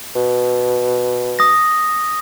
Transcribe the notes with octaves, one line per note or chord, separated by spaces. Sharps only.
B2
D#6 A#6